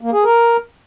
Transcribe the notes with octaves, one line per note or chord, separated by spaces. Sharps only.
A#3
G#4
A#4